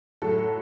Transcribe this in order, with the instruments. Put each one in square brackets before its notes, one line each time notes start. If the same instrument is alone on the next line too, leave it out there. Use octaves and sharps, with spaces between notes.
[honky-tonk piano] A2 F#3 A4